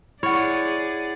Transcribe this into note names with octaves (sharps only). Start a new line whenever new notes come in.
E4 G#4 C#5 D5 F#5